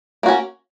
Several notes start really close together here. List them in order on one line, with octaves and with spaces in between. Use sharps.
A#3 F#4 C#4